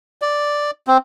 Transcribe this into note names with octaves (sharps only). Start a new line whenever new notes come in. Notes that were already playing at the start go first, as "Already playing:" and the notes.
D5
C4